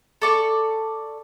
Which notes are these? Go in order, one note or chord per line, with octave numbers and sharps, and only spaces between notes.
A4 D5 C#6